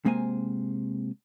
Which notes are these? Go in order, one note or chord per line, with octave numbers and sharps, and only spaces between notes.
C3 G#3 A#3 C5 G#5